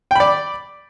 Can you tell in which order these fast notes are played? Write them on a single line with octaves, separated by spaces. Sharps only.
G5 B5 D5